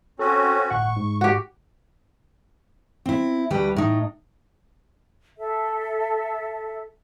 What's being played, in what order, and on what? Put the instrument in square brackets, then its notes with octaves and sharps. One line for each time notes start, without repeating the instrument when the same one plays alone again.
[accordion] C4 C#4 F#4 [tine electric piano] A4
[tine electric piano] G1 A2 F#5 [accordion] C#6
[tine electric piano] G#2
[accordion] D3 D#3 [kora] F#4 G4
[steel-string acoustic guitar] C4 E4
D2 G3 B4 G5
A2 D#4
[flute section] A4 E5